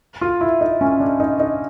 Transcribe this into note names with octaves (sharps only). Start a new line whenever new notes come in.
F4
E4
D#4
C#4
D4
D#4
D#4